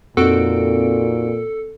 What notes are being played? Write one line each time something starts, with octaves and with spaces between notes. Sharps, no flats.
F2 A#2 C4 D#4 F#4 A4 D7